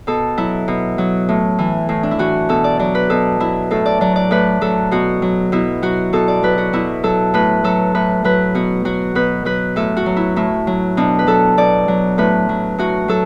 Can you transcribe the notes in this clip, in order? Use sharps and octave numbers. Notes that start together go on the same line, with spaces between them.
B2 A4
F#3 E4
B2
F#3
A2
E3
A2
D4
E4
E3 F#4
B2 A4
D5
F#3 D5
B4
B2 A4
F#3 E4
A2 A4
D5
F#3 D5
D5
A2 B4
F#3 A4
B2 F#4
F#3
B2 E4
F#3 F#4
B2 A4
D5
F#3 B4
F#4
B2 E4
F#3 A4
A2 B4
F#3 A4
A2 B4
F#3 B4
B2 F#4
F#3 F#4
B2 B4
F#3 B4
A2 A4
F#4
F#3
E4
A2 E4
F#3
B2 D4
B4
F#3 A4
B2 D5
F#3
A2 B4
F#3
A2 F#4
F#3 A4